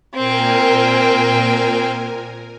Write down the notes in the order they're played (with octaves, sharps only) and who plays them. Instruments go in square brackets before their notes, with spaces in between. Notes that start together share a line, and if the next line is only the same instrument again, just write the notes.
[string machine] A#2 A#4 G#5 [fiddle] C4 G5